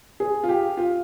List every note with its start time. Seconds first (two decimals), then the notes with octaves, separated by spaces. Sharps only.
0.20 G#4
0.44 F4
0.49 G4
0.77 F4